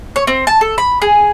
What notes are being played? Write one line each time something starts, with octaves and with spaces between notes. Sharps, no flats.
C#5
C4
A5
A4
B5
G#4